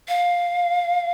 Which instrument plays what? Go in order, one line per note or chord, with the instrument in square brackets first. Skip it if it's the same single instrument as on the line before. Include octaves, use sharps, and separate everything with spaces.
[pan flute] F5